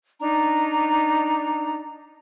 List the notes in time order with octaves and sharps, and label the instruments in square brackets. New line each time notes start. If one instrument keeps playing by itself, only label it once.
[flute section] D4 D#4 A#5